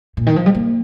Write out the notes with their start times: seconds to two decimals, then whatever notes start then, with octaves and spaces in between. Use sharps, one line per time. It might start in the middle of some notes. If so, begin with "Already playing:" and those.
0.17 A#2
0.27 D#3
0.36 F3
0.46 G3
0.55 A#3